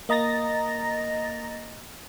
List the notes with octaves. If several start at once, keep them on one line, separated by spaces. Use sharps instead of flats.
A#3 D#5 A#5 A6 A#6